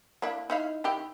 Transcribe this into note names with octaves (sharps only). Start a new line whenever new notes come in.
A#3 D4 E4
D#4 E4 F5
D#3 E4 G4